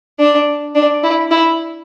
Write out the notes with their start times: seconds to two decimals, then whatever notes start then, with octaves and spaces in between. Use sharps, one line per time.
0.19 D4
0.75 D4
1.03 E4
1.31 E4